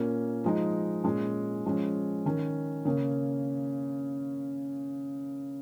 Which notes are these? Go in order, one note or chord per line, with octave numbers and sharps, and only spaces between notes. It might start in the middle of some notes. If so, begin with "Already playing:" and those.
Already playing: A#2 A#3 C#4
F3 G#3 D#4
A#2 G#3 C#4
F3 G#3 C#4
D#3 C#4
C#3 A#3 C#4